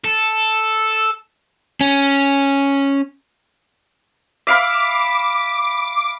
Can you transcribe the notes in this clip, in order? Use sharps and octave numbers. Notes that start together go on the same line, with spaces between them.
A4
C#4
E5 F5 B5 D6